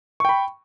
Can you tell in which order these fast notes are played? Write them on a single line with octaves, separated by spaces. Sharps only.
C#6 G5 B5